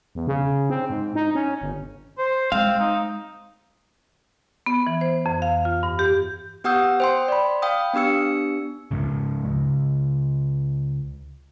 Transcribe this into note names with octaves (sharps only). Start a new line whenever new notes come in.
E2
C#3
C4
G#2
D#4
C#4
G1
C5
G#3 C4 F5
D#4
B3
E3
C5
F2
F5
F4
G2
G4
B3 G4 F#5 D#6 E6 G6
C5 G5 C6
D5 B5
F5 G5 D#6
B3 D4 G4 E6 C#7
C#2 G#2 C#3
C#2